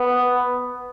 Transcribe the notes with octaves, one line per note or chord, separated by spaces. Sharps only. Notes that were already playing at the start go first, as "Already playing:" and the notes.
Already playing: B3